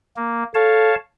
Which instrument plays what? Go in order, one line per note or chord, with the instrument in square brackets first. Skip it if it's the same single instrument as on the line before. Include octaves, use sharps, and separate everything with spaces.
[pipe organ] A#3
[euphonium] A4 [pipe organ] C#5 F5 A5